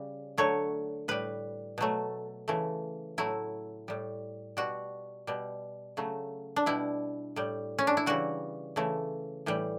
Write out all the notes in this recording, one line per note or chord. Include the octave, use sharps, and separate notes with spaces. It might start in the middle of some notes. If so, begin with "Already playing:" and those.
Already playing: C#3 G3
D3 F#3 A3 C#5
A2 G3 B4
B2 F#3 A3
C#3 E3 A3
A2 F#3 A3 E4
A2 G3
B2 G3 F#4
B2 G3
C#3 F#3 A3
D4
B2 G3 E4
A2 G3
C#4
D4
E4
C#3 E3 G3 F#4
C#3 E3 A3
A2 E3 G3